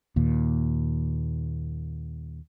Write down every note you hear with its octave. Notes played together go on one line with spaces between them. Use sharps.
D#2 A#2